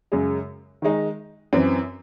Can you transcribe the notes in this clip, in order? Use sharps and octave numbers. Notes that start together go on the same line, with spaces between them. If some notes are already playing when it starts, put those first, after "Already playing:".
F#2 C#3 G#3
D#3 G#3 D#4
F#2 E3 C4